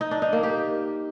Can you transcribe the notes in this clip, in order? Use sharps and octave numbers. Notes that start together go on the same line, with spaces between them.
D#4
D4
D#4
A#3
G4